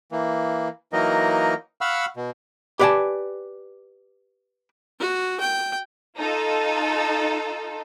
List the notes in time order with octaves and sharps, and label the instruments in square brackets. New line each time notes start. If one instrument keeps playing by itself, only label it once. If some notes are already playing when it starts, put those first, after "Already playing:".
[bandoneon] E3 A#3
E3 F#3 A#3 D#4 A#4 D#5
F5 F#5 B5 C#6 E6 F6
B2
[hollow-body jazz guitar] G4 B4 D5 F#5 G#5 A5
[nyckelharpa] F#4
G5
[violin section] D#4 F4 A4